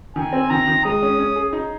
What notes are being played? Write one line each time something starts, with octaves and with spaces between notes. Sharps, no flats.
D#3 G#5
C4
D#3 A#5
D#3
G#3 D#6
C#4
C#4
G#4
D#4